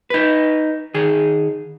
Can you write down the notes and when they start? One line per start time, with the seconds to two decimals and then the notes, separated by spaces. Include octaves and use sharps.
0.10 D#4 B4
0.94 D#3 G#4